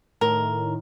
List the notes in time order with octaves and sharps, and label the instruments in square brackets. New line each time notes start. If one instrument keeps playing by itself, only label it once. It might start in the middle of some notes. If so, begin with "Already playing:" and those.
[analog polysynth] A2 D#3 [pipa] A#4